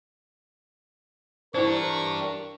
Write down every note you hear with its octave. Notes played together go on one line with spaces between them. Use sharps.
E3 D4 E4 G4 A#4 C5 C#6